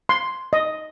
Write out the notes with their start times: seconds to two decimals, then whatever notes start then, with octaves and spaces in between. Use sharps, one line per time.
0.09 C6
0.53 D#5